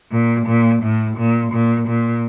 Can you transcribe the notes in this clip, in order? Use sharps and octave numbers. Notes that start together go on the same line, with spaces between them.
A#2
A#2
A2
A#2
A#2
A#2